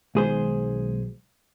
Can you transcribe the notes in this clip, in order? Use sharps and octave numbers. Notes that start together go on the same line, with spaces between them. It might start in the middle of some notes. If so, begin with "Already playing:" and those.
B1 D#3 G#3 G#4 C5